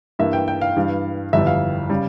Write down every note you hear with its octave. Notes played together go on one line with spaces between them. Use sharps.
G2 E3 A#3 E5
G5
G5
F5
G2 E3 G3
G1 F2 E3 G3 E5
F5
C#3 G3